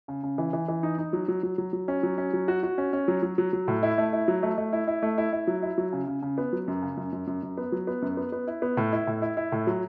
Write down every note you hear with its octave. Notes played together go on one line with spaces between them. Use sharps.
C#3
C#3
E3
E3
E3
D#4
D#4
F#3
F#3
F#3
F#3
F#3
C#4
F#3
C#4
F#3
F#4
F#4
C#4
C#4
F#3
F#3
F#3
F#3
A2
E4
A3
E4
F#3
A3
A3
E4
E4
A3
E4
E4
F#3
E4
F#3
C#3
C#3
C#3
B3
F#3
F#2
C#3
F#2
F#2
F#2
F#2
B3
F#3
B3
F#2
B3
B3
E4
B3
A2
E4
A2
E4
E4
A2
F#3